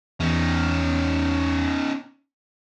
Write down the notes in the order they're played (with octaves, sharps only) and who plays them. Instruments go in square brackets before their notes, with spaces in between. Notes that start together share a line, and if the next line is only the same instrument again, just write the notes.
[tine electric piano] E2 [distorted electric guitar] C#4 D#4